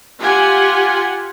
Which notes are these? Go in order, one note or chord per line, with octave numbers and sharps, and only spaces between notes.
F4 G4 F#5 G#5